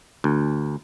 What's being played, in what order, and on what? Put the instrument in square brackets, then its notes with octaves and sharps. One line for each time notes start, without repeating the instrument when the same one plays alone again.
[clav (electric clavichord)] D2